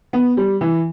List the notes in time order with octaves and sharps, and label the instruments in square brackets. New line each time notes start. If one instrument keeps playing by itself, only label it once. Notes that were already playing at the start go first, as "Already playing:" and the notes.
[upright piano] B3
G3
E3